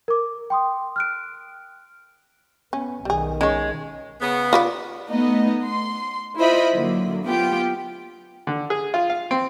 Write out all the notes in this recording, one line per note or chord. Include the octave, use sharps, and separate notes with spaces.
A#4 D6
G5 C6 D#6
F6 F#6 D7
B3 C#4
B1 D#3 G3 G#4
G#3 C#4 C#5
C#3 B3
F4 B4 D5
A3 B3 D#4 D#5
C6
E4 F4 C5 D#5 E5 B5
D3 F#3 A#3
B3 F4 G4 G5
D3
G#4
F4
F5
C4